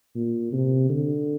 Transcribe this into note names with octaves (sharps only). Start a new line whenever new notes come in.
A#2
C3
D3